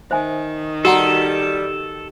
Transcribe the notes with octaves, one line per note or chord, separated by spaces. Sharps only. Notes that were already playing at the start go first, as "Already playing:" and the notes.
D#3 C5 E5 G#5
G3 F#4 A4 F#5 A#5